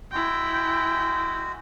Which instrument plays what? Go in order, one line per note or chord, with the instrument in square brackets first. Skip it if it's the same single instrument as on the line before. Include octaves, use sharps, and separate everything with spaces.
[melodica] G#3 F#4 [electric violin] E4 G5